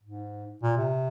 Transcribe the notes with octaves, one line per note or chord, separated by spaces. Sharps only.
G#2
A#2
C3